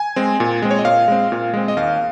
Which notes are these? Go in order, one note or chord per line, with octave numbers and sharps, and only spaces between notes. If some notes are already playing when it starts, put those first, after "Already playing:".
Already playing: G#5
G#3 C4
A#2
G#3 C4
C#5
D#5
A#2 F5
G#3 C4
A#2
G#3 C4
D#5
D#2 F5